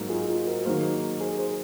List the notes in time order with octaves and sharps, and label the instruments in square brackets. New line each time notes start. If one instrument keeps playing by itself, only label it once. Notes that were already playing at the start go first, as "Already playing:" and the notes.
Already playing: [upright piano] G#2 F#3 A#3
[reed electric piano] F4 G#4
F4 G#4
F#4 A#4
[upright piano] D#3 F#3 A#3 [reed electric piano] G#4 C5
[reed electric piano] G#4 C5
G#4 C5